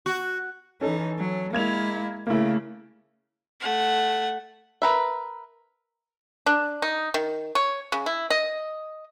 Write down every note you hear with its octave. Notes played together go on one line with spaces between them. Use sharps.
F#4
E3 C#4 D#4 A4
F#3
G#3 A#3 E4 G#6 F7
C#3 A3 A#3 E4
A3 F#5
A#4 B4 E5
D4
D#4
D#3
C#5
C#3
E4
D#5